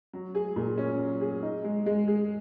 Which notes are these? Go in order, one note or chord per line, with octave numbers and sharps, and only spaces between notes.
F#3
G#4
A#2
C#4
F#3
G#4
D#4
G#3
G#3
G#4